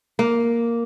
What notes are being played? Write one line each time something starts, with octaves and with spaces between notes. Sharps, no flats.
A#3